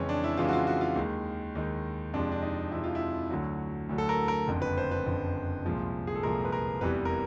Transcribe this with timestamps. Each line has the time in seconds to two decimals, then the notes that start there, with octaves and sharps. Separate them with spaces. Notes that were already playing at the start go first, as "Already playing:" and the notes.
Already playing: F2 C#3 E3 G#3 C#4
0.09 D4
0.24 E4
0.37 F2 C#3 E3 G#3 F4
0.48 F#4
0.53 F4
0.67 F#4
0.81 F4
0.96 D#2 D#3 G#3
1.55 D#2 D#3 G#3
2.14 F2 C3 F3 G#3 D4
2.32 D4
2.42 D#4
2.71 F2 C3 F3 G#3 E4
2.84 F4
2.95 E4
3.30 D2 D3 F#3
3.89 D2 D3 F#3
3.98 A4
4.09 A#4
4.28 A#4
4.47 F#1 F2 D3
4.62 B4
4.77 C5
4.91 B4
5.06 F#1 F2 D3
5.65 C2 A#2 F3 G#3
6.07 G#4
6.15 A4
6.23 C2 A#2 F3 G#3 A#4
6.45 B4
6.52 A#4
6.81 F1 E2 C3 E3 G3 B4
7.05 A#4